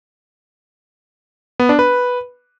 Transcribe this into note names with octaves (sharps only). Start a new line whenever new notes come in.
B3
D4
B4